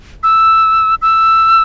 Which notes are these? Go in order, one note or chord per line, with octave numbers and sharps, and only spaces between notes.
E6
E6